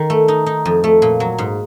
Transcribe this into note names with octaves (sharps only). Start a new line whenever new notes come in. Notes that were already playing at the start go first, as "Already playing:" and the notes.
Already playing: D#3
A3
D#4
D#4
F2
A3
A#2
F#3
G#2